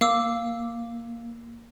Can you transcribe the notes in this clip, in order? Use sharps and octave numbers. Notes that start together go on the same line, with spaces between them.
A#3 F5 D6 E6